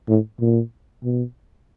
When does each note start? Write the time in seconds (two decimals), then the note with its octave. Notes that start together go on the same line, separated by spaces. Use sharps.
0.08 A2
0.40 A#2
1.04 B2